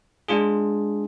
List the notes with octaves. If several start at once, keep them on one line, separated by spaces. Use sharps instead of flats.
G#3 D4 F4 G#4